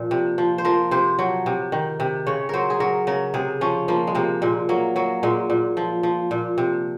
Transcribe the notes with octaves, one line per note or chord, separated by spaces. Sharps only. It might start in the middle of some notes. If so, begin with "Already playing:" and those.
Already playing: A#2 F3
C3
F3
C5
F3 A#4
C3 C5
F#3
C3
D#3
C3
C#3 C#5
F#3 A#4 C5
G#4
F#3 A#4
C#3 A#4
C3 G#4
F3 C#4
F3 A#3
G#3
C3 A#3
A#2 G#3
F#3 A#3
F#3 A#3
A#2 G#3
A#2
F3
F3
A#2
C3